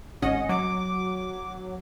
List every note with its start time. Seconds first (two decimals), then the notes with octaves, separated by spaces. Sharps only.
0.22 G#1 C#4 D#5 F#5
0.49 F#3 D6